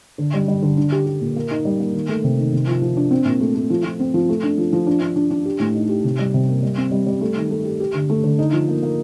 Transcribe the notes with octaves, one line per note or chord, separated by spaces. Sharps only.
D3
G3
G3
D3
D4
G4
G4
A#2
A#3
D#4
G3
A#3
D#3
A3
C3
D#3
C3
F3
F3
D4
C4
A#2
A3
A3
F3
F3
C4
F3
A3
D4
F3
F3
D4
D4
D4
D4
G4
A2
D#4
G4
C3
G3
C3
A#3
G3
C4
G3
G3
A3
D#3
A3
G4
G4
D3
A3
D3
D#4
F3
A#3
A#3